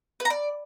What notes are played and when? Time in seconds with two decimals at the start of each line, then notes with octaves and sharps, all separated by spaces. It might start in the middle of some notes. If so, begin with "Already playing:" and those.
0.20 B4
0.25 A#5
0.30 D5